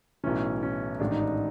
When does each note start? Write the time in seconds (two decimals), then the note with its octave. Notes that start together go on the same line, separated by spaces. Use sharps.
0.24 B1 A2 E3 C#4
0.63 C#4
1.00 A1 G#2 D#3 D4
1.11 D#4
1.21 D4